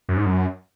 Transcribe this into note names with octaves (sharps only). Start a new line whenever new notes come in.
F#2
G#2
F#2